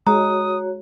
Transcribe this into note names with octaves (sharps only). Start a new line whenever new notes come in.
G#3 F#4 C#5 A#5 D#6